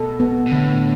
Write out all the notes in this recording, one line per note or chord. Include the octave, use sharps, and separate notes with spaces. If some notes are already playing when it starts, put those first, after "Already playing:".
Already playing: B2 A4
B3
B2
A2 D3